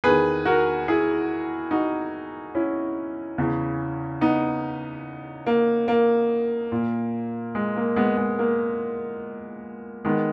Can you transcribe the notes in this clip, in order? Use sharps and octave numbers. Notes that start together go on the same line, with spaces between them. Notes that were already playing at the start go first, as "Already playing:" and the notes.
E2 D#3 G#4 B4
F#4 A#4
E4 G#4
D#4 F#4
C#4 E4
E2 C#3 E3
B3 D#4
A#3
A#3
A#2
G#3
A#3
G#3 B3
G#3
A#3
D#3 G#3 B3